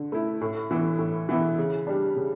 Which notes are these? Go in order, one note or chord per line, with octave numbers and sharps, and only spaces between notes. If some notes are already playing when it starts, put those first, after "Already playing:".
Already playing: D3
A3 E4
A2
E3 B3 E4
A2
E3 B3 E4
C#3
G3 D4
C#3